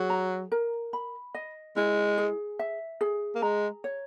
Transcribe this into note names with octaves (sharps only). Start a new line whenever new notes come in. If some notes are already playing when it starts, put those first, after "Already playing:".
Already playing: F#3 G#4
A#5
A#4
B5
D#5
G#3 E4
G#4
E5
G#4
A#3
G#3 A#5
C#5